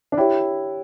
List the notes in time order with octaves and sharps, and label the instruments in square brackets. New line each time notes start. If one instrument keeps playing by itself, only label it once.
[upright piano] D4
[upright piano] E4 [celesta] G4 C#5 G5